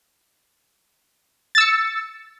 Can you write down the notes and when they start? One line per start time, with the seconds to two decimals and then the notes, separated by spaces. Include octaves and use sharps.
1.55 A6
1.58 E6
1.61 C#7